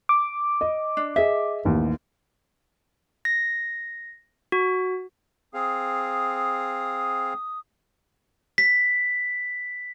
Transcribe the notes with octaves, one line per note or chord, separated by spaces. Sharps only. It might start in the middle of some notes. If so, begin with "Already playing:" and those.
D6
D#5
D4
G#4 D#5 E5
A1 D#2
A#6
F#4
C4 G#4 F5 D#6
B6